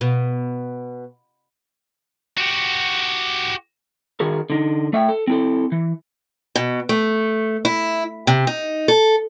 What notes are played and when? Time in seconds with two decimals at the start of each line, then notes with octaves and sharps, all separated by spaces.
0.01 B2
2.38 F#4 G4
4.20 D#3 F#4 G#4 A#4
4.50 D3 D#4
4.93 A3 E5 F5 G5
5.09 A4
5.27 C4 E4 A4
5.72 E3
6.56 B2
6.89 A3
7.65 E4
8.27 C3
8.47 D#4
8.88 A4